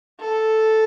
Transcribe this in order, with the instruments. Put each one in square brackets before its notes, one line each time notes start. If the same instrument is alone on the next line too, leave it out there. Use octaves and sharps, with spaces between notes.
[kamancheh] A4